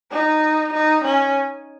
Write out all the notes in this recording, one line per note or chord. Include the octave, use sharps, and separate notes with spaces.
D#4
D#4
C#4